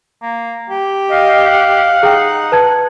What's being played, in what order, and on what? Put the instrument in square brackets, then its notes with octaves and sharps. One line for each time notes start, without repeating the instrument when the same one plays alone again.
[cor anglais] A#3
G4
[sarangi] D#5 [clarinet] F5
[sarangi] F#5
[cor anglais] D#4 [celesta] G#4 G5
[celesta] B4 A5 G#6